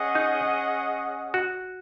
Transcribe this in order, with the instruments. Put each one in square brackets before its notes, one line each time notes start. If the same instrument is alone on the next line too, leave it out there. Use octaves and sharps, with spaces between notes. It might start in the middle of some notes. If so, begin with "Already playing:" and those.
Already playing: [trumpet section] C#4 G#4 D#5 F#5
[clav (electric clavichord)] D#4
F#4